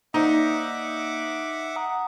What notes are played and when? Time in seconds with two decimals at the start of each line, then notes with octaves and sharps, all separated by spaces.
0.14 A#3 D#4 C5 D5 E5 F#5 D6
1.76 F#5 A#5 D#6